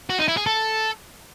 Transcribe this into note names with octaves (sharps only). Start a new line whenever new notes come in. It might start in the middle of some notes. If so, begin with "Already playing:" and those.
F#4
D#4
E4
G#4
A4